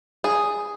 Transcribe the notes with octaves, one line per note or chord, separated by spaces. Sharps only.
G#4